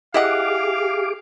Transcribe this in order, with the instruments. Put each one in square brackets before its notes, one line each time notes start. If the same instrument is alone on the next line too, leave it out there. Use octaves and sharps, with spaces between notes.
[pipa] E4 D#5 F#5 [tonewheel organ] G4 G#4 D6 [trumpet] F5